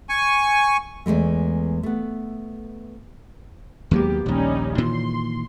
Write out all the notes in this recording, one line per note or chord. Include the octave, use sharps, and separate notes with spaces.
G#5 C#6
E2 G#2 G#3 A3
A3 B3
D#2 F#3 G#3 A#3 B3 G4
A#1 D#2 G3 C#4 D#4
A#2 D#3 E3 C6